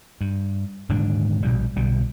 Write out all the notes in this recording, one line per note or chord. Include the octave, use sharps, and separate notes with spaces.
G2
D#1 G#2 D3 D4
A#1 B2 G3
B1 B2 D3 G3